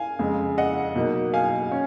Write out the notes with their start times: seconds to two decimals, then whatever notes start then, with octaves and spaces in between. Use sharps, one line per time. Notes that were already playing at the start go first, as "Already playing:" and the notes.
Already playing: F5 G#5
0.19 F2 C#3 G#3
0.58 D#5 F#5
0.95 B2 F#3 A#3 D#4
1.34 F5 G#5
1.72 C#4